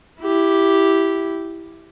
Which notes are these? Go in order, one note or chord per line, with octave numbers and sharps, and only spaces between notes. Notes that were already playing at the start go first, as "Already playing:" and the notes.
E4 G4